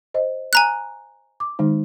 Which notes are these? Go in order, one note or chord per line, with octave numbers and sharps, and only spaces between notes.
C5 D#5
G#5 A#5 F#6
D6
D#3 G#3 D#4